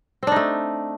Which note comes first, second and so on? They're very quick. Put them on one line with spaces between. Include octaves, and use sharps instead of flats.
C4 D4 D#4 A3